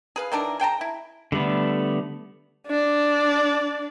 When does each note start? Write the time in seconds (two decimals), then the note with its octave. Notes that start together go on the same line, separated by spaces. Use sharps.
0.16 G#4 B4 F5
0.32 D#3 E3 D4 A#4
0.60 G#4 G5 A5 A#5
0.81 E4
1.32 D3 G3 A3 B3
2.67 D4 D5